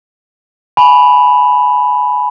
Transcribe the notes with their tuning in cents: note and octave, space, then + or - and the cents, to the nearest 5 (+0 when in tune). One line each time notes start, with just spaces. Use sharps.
G#5 +20 B5 +0